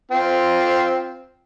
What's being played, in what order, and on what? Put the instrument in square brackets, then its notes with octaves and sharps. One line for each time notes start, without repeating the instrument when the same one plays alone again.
[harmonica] C4 F4